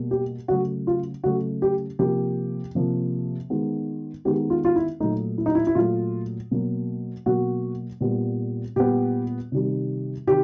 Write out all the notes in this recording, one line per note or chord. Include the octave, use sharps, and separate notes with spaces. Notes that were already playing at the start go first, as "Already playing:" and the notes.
Already playing: B2 G3 A#3
G4
C#3 F#3 A3 F#4
F4
C#3 F#3 A3 F#4
G4
C3 F3 A#3 G4
C3 F3 A#3
D#3 G#3 B3
D#3 G#3 B3 G4
F4
F4
E4
A#2 F#3 A3 D#4
E4
D#4
E4
E4
A#2 F#3 A3 F4
B2 F#3 A#3
B2 F#3 A#3 F#4
A#2 G3 B3
A#2 G3 B3 G4
C3 D#3 G3
C3 D#3 G4